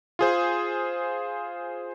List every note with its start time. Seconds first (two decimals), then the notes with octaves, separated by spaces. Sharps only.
0.19 F4 G#4 C5